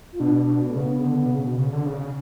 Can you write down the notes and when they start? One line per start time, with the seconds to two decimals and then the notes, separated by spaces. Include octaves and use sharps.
0.13 F4
0.20 B2 D4
0.39 D4
0.67 A3
0.75 C#3 B3
1.04 D3
1.25 B2
1.31 C#3
1.44 B2
1.59 C#3
1.73 D3
1.86 C#3